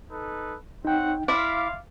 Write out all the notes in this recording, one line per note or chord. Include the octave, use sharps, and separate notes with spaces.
D#4 A4 B4
C4 D#4 C#5 F#5 G5
E4 D5 E5 F5 C6